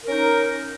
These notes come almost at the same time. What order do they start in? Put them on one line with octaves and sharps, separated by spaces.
A#4 C#4 D#4